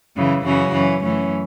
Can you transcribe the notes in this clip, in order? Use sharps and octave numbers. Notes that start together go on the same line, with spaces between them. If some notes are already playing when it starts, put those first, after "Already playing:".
F#2 C#3 E3
F#2 C#3 E3 C#4 F#4
F#2 E3 C#4
F#2 E3 A3 C#4